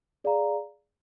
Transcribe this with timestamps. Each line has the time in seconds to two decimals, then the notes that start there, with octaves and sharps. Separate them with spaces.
0.24 G#4 D5 F5 A#5